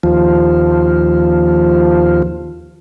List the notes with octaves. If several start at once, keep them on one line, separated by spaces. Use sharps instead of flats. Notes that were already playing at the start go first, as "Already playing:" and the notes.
D#2 F3